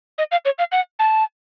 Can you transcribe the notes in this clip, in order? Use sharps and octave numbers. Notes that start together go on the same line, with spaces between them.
D#5
F5
C#5
F5
F#5
A5